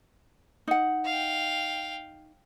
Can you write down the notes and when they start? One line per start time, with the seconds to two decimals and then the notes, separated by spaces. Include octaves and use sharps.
0.68 D#4 F#5
1.06 F5 G5